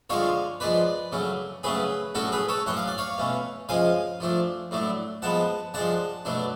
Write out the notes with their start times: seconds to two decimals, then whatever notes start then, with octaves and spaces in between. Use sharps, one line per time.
0.10 D3 F3 G#3 D4 C#5 F5
0.60 F3 G#3 D4 B4 D5
1.12 C#3 F#3 A3 C#4
1.63 C#3 F#3 A3 C#4 G#4 B4
2.15 A2 F#3 C#4 F#4 A4
2.32 G#4 B4
2.48 A4 C#5
2.66 A2 F#3 C#4 F#5
2.77 F5
2.88 D5
2.98 C#5 F5
3.18 B2 A3 C#4
3.69 C#3 F3 G#3 F5 G#5
4.20 F3 A3 D4
4.71 A2 F#3 A3 D4
5.22 F3 G#3 B3 F#5 A5
5.74 F3 G#3 D4 F#5 A5
6.25 B2 F#3 A3 D4